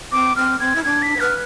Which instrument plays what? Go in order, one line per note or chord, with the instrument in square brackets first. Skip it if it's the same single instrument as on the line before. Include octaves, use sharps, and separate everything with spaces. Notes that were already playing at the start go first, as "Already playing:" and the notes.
[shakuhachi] C4 [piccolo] D6
[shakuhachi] C4 [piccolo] F6
[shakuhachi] C4 [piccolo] G#6
[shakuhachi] E4
[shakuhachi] D4 [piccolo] G#6
[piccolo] B6
[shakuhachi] C5
[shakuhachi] B4 [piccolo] F6